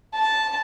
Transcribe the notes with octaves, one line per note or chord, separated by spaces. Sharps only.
A5